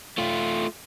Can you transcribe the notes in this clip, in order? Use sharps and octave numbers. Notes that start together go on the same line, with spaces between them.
A3 F4